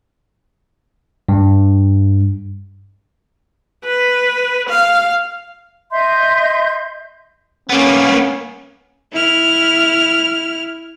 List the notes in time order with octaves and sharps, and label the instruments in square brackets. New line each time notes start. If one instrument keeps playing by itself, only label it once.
[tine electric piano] G2
[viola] B4
F5
[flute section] D#5 E5 C6 G6
[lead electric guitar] A#3 B3 [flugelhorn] C#4
[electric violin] E4 F6